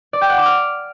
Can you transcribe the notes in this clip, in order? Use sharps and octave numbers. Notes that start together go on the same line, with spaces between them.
D5
G5
F#5
D6
F6